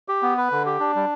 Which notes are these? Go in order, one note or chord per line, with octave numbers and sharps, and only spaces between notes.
G4
B3
B4
D3
G4
D4
G3